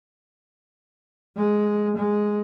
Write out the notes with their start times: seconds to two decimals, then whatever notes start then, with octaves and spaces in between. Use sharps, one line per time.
1.36 G#3
1.96 G#3